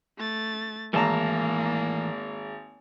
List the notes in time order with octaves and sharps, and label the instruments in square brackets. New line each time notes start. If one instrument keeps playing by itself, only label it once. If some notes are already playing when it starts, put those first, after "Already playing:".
[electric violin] A3 A6
[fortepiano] G#1 A#5 [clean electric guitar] A2 E3 A5 [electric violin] A#3